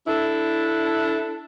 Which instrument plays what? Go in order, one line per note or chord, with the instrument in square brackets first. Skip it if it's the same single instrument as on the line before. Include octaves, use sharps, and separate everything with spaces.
[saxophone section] D4 E4 A4